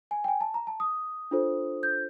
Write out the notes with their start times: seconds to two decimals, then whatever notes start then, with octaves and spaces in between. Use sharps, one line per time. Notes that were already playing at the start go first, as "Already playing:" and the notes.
0.11 G#5
0.24 G5
0.28 G#5
0.41 A5
0.54 A#5
0.67 A5
0.80 D#6
1.31 D4 F4 A4 C5
1.83 G6